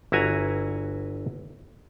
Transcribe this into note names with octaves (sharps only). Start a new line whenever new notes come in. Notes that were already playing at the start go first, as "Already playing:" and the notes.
G1 E4 F#4 G#5 A#5